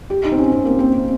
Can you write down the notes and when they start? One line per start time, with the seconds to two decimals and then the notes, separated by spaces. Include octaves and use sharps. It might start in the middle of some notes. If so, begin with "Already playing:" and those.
0.10 G4
0.24 D#4
0.32 C4
0.38 C#4
0.52 C4
0.65 A#3
0.79 C4
0.93 C4